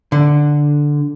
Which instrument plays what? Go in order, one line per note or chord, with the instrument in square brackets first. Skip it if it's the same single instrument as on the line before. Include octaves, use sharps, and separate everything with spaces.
[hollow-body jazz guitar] D3